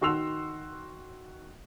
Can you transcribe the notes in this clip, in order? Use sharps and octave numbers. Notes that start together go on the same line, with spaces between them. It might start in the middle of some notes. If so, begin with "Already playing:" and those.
D#3 F#4 C6 E6 F7